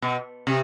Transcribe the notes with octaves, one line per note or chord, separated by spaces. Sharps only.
B2
C3